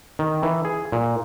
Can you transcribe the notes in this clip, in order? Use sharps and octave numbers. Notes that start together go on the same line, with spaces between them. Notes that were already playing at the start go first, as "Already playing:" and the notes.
D#3
E3
G#4
A#2